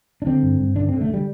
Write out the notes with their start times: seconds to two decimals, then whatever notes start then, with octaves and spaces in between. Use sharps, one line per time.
0.22 D4
0.26 D3 C4
0.43 G2
0.60 G2
0.76 D3 D4
0.89 D3 C4
1.01 A3
1.09 D3 G3